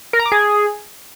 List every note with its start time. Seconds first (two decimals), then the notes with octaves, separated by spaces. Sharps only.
0.13 A#4
0.19 A#5
0.26 D6
0.32 G#4